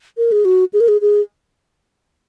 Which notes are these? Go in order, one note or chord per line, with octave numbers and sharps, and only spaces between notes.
A#4
G#4
F#4
G#4
A#4
G#4
G#4